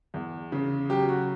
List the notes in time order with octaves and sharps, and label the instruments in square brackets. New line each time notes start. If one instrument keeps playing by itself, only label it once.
[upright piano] E2
C#3
F#3 G4
F#4